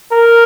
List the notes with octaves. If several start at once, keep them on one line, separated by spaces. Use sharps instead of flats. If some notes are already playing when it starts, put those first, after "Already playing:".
A#4